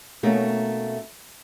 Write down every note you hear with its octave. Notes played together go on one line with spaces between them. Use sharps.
B2 A3 A#3 C#4 D#4